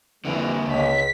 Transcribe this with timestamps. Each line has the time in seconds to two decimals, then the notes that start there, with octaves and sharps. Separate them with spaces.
0.25 F2 D3 E3 G3 A#3
0.68 C#2 B6